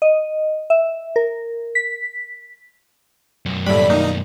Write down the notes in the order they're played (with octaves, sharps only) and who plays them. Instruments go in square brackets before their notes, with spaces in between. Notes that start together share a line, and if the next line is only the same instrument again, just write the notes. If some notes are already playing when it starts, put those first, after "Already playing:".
[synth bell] D#5
E5
A#4
B6
[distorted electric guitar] B1 F#2
[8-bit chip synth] A2 B5 [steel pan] G3 A3 [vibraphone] D5
[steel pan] A#3 [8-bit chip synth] D#4